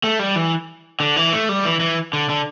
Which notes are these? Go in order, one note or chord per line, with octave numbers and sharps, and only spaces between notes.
A3
G3
E3
D3
E3
A3
G3
E3
E3
D3
D3